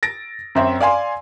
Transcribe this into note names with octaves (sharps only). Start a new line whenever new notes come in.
A6 A#6 D7
F#2 C4 E5
D5 F5 G#5 C6